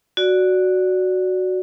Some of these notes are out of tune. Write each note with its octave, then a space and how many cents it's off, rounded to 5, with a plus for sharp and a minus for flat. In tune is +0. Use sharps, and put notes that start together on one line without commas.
F#4 +0 D5 +0